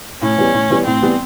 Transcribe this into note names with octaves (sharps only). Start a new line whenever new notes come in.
A2 C#4
E3 G3 B3
A2
E3 G3 B3
A2 C4
E3 G3 B3